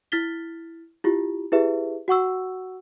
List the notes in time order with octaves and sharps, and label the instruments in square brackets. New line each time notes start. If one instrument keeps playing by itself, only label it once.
[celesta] E4 F6 A6 B6 G7
E4 F4 G4
E4 G4 G#4 B4 E5
F#4 F#5 C#6 E6